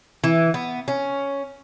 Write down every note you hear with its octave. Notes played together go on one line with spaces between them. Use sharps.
E3
B3
C#4